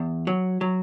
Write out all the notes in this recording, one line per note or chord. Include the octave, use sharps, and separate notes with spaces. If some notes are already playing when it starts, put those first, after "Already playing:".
Already playing: E2
F#3
F#3